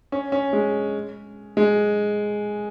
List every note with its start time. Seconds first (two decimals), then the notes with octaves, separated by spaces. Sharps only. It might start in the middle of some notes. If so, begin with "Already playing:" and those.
0.12 C#4
0.32 C#4
0.53 G#3
1.57 G#3